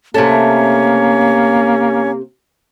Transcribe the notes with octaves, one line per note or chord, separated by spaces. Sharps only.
C3 A3 A#3 C#4